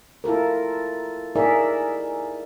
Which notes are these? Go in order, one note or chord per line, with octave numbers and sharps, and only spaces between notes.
E4 F4 A4 A#4
D#4 E4 G#4 A#4 D5 E5